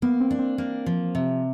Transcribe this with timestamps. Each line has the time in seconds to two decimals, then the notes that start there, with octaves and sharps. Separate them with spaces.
0.02 A#3 B3
0.20 C4
0.31 D4
0.39 C4
0.58 A#3
0.86 F3
1.15 C3